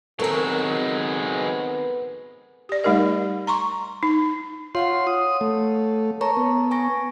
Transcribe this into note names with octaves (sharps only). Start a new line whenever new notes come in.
D#3 F#3 G#3 B3 C4 A4 A#4
G4 D5
G3 A3 D#4 G4 A#4 D#5
A#5 C6 C#6
D#4
F4 C#5 F5 F#5 C6
D#6
A3
A#4 C#5 A5 A#5 C#6
B3
G#5 C#6 A#6